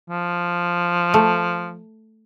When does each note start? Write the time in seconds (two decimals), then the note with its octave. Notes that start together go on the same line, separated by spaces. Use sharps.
0.10 F3
1.14 A3